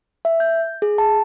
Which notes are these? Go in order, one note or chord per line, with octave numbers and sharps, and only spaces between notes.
E5
G6
G#4
A5